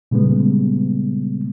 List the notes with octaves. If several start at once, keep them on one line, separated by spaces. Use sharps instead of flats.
A#2 C#3 G3 G#3 B3